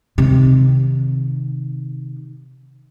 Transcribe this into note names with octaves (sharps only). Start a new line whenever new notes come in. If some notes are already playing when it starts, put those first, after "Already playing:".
C3 D#3